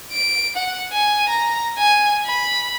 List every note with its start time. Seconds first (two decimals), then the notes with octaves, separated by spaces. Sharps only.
0.12 D7
0.56 F#5
0.92 G#5
1.29 A#5
1.78 G#5
2.26 B5